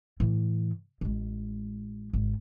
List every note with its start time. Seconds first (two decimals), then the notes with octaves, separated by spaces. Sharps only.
0.20 A2 E3
1.01 A1 G#3
2.13 G#1